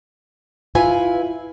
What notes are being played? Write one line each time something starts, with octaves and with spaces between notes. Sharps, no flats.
E4 F4 B4 G#5